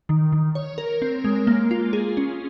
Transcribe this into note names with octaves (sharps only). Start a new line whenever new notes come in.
D#3
D#3
C#5
A#4
C4
G#3
A#3
F4
G#4
C#4